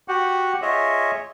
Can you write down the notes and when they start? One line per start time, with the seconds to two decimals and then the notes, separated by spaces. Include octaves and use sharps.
0.08 F#4 G4 F#5
0.62 F4 G#4 C#5 D#5 E5